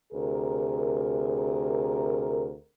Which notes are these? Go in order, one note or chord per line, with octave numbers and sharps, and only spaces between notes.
D2 C3 G#4 A#4